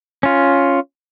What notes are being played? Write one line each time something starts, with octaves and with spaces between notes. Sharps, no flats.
C#4 F4